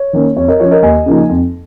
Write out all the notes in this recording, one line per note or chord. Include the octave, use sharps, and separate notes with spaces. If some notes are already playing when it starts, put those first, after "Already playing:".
Already playing: C#5
D#3 A#3 C#4
F2 C#5
A#4 D#5
F3 C#4 C#5
A#4 D#5
D#2 D#5 G#5
C#3 F3 A#3 D#4
F2